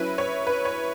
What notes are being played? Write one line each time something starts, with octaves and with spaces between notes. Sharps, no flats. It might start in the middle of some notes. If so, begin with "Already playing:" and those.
Already playing: F#3 C#4 E4 B4
C#5
B4
C#5